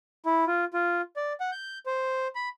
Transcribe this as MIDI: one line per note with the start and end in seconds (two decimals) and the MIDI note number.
0.26 0.45 64
0.47 0.65 65
0.74 1.01 65
1.16 1.33 74
1.40 1.51 78
1.52 1.78 91
1.86 2.28 72
2.35 2.49 83